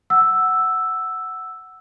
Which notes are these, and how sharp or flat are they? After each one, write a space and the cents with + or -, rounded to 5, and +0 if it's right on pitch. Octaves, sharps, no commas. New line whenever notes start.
F#5 +0 E6 +0